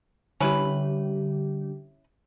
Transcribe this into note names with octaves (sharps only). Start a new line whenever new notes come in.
D3 G3 C#4 E4 G4 B4